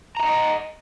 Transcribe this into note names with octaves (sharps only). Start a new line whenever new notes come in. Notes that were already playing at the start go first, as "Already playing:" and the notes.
D#5 E5 F#5 A#5